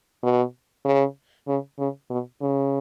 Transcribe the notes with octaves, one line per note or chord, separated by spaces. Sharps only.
B2
C#3
C#3
C#3
B2
C#3